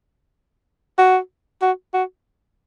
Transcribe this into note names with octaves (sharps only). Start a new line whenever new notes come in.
F#4
F#4
F#4